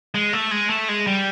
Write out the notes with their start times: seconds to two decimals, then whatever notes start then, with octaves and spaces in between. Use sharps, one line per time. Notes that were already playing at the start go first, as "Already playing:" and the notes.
0.14 G#3
0.33 A3
0.51 G#3
0.70 A3
0.89 G#3
1.07 G3